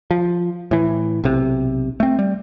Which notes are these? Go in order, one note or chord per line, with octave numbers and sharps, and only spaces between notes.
F3
A2 E3
B1 C3
A3 C4
G3